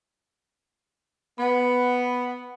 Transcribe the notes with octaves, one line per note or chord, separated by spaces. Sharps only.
B3 F#5 B5